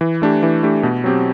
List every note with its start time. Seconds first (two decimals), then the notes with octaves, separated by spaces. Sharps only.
0.01 E3
0.22 A3 D4 G4
0.43 E3
0.63 A3 D4 G4
0.83 B2
1.04 F#3 C4 G4